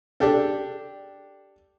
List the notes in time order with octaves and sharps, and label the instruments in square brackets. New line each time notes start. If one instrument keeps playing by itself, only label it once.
[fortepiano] D4 G4 A4